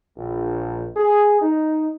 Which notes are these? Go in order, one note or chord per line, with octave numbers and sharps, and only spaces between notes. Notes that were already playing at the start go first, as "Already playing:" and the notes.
A#1
G#4
D#4